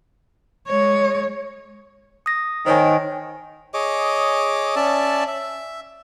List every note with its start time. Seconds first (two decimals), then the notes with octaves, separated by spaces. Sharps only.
0.67 G#3 C#5
2.26 D#6 A#6
2.66 D#3 C5 C#5 G#5
3.74 G#4 C#5 D#5 D6
4.76 C#4 D5 E5 A5
5.28 E5